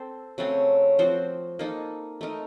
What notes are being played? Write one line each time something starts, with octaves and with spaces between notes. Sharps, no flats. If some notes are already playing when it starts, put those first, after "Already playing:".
Already playing: C4 A4 C5
C#3 F#3 A3 C4
F3 C4 F#4 C5
A#3 D#4 A4
A3 D#4 A#4